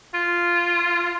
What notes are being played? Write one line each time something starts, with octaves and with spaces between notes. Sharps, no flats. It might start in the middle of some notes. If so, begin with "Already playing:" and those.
F4